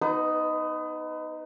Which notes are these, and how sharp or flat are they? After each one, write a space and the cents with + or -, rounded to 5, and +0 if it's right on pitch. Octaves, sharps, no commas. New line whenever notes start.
B3 +0 D#4 +0 B4 +35